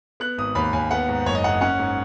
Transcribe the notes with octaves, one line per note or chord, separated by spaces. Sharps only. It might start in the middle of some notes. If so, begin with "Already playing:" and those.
B3 F#6
G#1 D#6
D#2 B5
D#2 G#5
B3 F#5
G#2
F#1 C#5
D#5
F#1 F#5
C#4 F#5
G#2